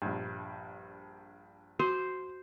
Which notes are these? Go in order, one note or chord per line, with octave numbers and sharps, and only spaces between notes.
A#1 G2
F#4 C5 C6 D6